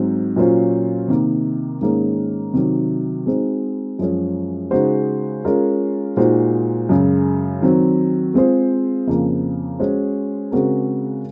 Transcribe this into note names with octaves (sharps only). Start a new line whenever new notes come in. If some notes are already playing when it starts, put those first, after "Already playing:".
Already playing: G#2 F#3 C4
A#2 F#3 C#4 F4 C5
C3 D#3 A#3
G#2 D#3 A#3 C#4 G#4
C3 D#3 F#3
G#3 C4 D#4 F#4 C5
F#2 F3 G#3 C#4 G#4
C#3 G#3 D#4 F#4 C5
G#3 C#4 F4 A#4
A#2 G#3 D#4 F#4 C5
F#2 C#3 G#3
D#3 F#3 C4
G#3 C4 F4 G#4 C5
F2 C#3 F3 A#3
G#3 C#4 F#4 C5
C#3 G#3 C4 F#4 A#4